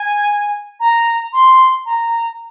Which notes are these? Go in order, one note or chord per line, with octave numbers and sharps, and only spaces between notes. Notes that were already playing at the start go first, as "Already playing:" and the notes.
Already playing: G#5
A#5
C6
A#5